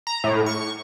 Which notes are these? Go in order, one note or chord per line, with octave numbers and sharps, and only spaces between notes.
A#5
A2
C#6